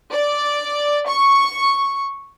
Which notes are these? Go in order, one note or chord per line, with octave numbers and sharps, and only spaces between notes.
D5
C#6